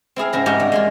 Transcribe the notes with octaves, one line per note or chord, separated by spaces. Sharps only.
C4 E4 G#4 F5
G#2 C#3 C4 A#4
G#2 D#4 F#4 G4 A#4 G5
G2
G#3 A#3 F4